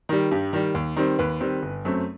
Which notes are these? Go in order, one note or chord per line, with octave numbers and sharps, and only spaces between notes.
D#3 G3
G2 G4
D#3 G3
D#2
D#3 G3 C4
D#2 B4
D#3 G3 C4
G1
F#2 F#3 A3 C4